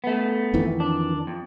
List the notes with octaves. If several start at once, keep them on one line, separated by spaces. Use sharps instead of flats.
A3 B3
F2 D#3 E3
D4
F2